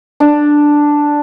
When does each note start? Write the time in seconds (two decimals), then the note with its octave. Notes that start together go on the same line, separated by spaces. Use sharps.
0.20 D4